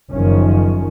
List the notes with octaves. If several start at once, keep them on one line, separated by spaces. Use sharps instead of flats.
F#1 F#2 D#3 F3 C#4